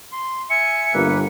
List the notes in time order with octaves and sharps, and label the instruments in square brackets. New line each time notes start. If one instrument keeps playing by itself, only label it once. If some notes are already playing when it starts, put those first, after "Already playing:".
[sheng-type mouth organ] C6
[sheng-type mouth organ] E5 G#5 [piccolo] C#7
[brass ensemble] G1 [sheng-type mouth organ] A#3 B4